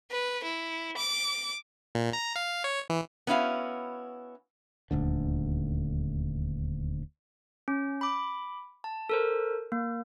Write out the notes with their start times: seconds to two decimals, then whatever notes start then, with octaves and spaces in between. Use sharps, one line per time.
0.11 B4
0.43 E4
0.97 D6
1.95 A#2
2.13 A#5
2.36 F5
2.64 C#5
2.90 E3
3.27 B3 C#4 E4 F#4 F5
4.91 D#1 D2 D3
7.68 C#4
8.01 B5 D6
8.84 A5
9.09 A4 A#4 C5
9.72 A#3